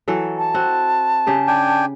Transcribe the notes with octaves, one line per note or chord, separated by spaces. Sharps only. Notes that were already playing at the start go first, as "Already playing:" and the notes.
E3 F#3 A4
A5
C4 F#4
C#3 G4 G#4
D4 G5 G#5